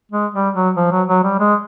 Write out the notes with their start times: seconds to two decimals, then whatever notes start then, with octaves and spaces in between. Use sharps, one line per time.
0.12 G#3
0.34 G3
0.55 F#3
0.76 F3
0.91 F#3
1.09 F#3
1.23 G3
1.39 G#3